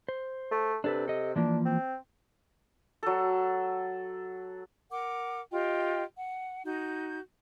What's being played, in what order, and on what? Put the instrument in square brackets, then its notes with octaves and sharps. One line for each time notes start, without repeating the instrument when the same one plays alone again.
[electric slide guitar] C5
[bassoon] A3
[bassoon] C3 [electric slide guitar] D4 A4 B4
[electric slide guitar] A4 D#5
[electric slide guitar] E3 F3 A#3 [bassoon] D4
[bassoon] C4
[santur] F#3 A4
[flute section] A#4 F#5 D6
F4 G4 D#5 G5
F#5
D#4 F#4 G6